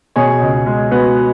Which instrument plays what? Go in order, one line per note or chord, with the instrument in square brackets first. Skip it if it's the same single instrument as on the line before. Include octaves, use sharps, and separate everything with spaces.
[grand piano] B2 G#4 C#5
C#2
G#3
B3 F#4 B4